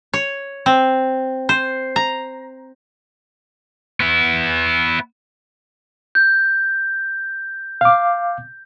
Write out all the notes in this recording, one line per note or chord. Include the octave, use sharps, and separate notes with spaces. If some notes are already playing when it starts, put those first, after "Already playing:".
C#5
C4
C5
A#5
B3 E4
G6
F5 D6